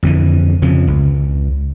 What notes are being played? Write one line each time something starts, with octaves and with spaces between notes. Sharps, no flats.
F2 D3 E3
F2 C#3 F3
C#2